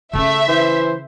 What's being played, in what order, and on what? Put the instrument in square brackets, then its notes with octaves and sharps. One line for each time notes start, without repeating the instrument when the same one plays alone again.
[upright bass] C#3 C#4 [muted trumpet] A3 [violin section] E5
[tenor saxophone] E3 [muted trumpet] C5